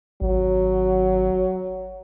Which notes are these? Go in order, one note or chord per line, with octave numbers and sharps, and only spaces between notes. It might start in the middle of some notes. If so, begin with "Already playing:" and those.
G#1 F#3